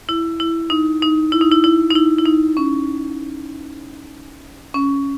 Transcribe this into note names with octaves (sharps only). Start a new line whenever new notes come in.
E4
E4
D#4
D#4
E4
D#4
E4
E4
D#4
E4
E4
D#4
C#4
C#4